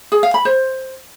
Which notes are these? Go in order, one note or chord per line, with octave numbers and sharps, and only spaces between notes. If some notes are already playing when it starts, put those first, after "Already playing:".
G#4
F5
B5
C5